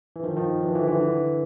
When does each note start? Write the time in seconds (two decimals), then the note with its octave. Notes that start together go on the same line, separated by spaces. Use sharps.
0.16 E3
0.24 D#3 F3
0.37 D#3 F3
0.62 E3 F#3
0.69 F3
0.75 D3 E3
0.87 D3 E3
1.01 D3 E3